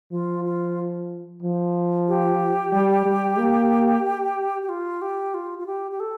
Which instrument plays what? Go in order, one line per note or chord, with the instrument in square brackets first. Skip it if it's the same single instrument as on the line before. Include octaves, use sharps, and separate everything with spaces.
[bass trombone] F3 [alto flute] F4
[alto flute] F4
[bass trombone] F3
[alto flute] G4
[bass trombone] G3
G3
A#3
[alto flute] G4
F4
G4
F4
F4
G4
G4
A4